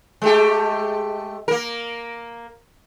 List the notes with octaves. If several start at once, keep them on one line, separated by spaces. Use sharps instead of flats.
G#3 A3 G4
A#3 A#4